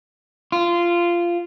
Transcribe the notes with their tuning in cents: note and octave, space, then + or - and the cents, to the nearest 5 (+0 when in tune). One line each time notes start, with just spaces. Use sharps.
F4 -15